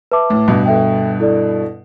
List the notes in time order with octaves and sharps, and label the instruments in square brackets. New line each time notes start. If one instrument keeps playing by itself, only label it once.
[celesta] B4 E5 A5 D6
[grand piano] A2
G2 B2
[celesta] A4 E5 G5
E4 A4 D5